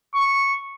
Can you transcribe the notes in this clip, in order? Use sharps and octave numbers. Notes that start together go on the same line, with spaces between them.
C#6